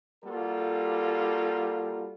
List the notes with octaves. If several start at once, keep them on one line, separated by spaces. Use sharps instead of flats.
G3 A#3 F4 F#4 A4